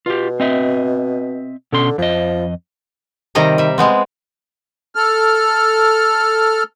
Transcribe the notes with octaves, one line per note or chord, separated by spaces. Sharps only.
B2 F4 G4
C4 D#5 E5
B2 D3 C#4 C6
F2 F3 D#5
C3 D#3 G3 D#5 A#5
G3 E5
G#3 B3 C4
A4 F6